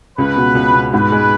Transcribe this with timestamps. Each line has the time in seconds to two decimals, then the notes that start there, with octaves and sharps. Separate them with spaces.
0.17 C#2 B4
0.36 B2
0.55 C#2
0.74 B2
0.92 G#2 B4
1.12 G#3